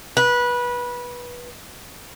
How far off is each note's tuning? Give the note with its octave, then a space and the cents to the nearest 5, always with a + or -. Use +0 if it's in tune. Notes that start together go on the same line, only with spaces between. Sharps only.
B4 -20